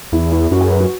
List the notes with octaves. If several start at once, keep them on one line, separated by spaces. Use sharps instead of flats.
E2 E4
E4
F#2 F#4
G#4
B4
F#4